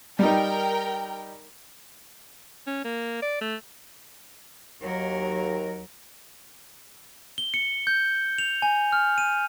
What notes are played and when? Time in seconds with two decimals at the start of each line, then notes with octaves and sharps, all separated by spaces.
0.19 G3 D#4 A#4 G5
2.67 C#4
2.84 A#3
3.22 D5
3.41 A3
4.81 D#2 F#3 A#4
7.38 G7
7.54 C#7
7.87 G6
8.38 F7
8.62 G#5
8.92 F6
9.18 D#7